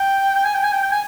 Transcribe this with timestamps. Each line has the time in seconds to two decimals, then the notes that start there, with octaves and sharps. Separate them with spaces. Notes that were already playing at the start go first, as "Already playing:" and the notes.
Already playing: G5
0.35 G5
0.45 G#5
0.54 G5
0.63 G#5
0.73 G5
0.83 G5
0.91 G#5